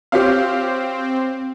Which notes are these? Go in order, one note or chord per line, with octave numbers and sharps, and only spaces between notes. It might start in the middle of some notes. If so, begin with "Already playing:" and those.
C4 G4 C#5 F5